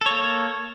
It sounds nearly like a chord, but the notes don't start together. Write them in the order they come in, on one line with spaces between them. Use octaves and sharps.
A4 C#5 A#3